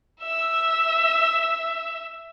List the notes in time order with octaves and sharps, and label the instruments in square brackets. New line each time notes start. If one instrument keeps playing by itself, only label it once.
[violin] E5 E6